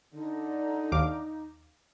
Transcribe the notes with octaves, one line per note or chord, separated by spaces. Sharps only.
D3 D#4
D#2 F5 D6